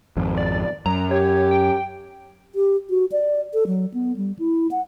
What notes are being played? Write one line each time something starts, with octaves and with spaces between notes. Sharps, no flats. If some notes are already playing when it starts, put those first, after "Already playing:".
G#1 F2
D5
F#2 A#5
G4 C#5
G5
G4
F#4
D5
A4
F#3
B3
G3
E4
F#5